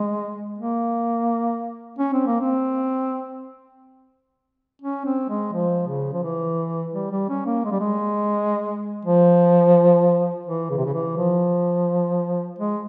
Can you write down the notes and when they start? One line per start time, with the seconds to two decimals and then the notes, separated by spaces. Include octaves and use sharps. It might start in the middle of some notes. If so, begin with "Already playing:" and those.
Already playing: G#3
0.58 A#3
1.99 C#4
2.13 C4
2.27 A#3
2.40 C4
4.82 C#4
5.06 C4
5.29 G#3
5.53 F3
5.87 C#3
6.13 F3
6.23 E3
6.94 G3
7.12 G3
7.29 C#4
7.46 A#3
7.65 G#3
7.72 G3
7.80 G#3
9.05 F3
10.47 E3
10.70 C#3
10.77 C3
10.86 C#3
10.94 E3
11.17 F3
12.59 G#3